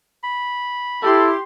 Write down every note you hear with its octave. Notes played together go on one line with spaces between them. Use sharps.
B5
E4 G4 A4 C6